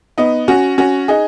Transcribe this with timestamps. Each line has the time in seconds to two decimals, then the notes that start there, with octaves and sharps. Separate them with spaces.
0.18 B3 D#4
0.48 C#4 F#4
0.78 C#4 F#4
1.08 D#4 G#4